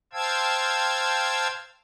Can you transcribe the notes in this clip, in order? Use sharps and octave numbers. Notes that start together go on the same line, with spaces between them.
C5 F5 G5 A5 E6 G#6